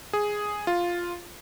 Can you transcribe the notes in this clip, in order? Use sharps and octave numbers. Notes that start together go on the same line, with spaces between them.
G#4
F4